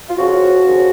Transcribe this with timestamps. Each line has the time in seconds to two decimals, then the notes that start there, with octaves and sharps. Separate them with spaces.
0.08 F4
0.18 F2 C#3 F3 F#4
0.64 D#2 C#3 F3